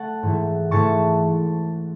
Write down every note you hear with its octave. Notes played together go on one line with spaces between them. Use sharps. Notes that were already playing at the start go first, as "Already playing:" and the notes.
Already playing: A3 F#5 A5
G#2 E3 A3
G#2 E3 A3 A5 C#6